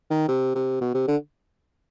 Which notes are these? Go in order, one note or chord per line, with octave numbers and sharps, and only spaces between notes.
D#3
C3
C3
B2
C3
D3